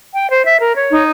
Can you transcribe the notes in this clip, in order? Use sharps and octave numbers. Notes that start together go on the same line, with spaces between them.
G5
C5
E5
A#4
C#5
D#4